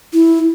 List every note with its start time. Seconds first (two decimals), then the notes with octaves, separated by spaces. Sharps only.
0.13 E4